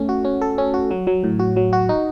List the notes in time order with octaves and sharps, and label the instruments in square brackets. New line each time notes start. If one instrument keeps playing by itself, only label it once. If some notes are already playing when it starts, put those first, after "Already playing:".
Already playing: [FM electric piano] A3 C#4
F#4
C#4
A4
C#4
F#4
F#3
F#3
A2
F#4
F#3
F#4
D#4